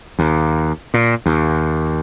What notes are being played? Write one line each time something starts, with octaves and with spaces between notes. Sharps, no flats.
D#2
A#2
D#2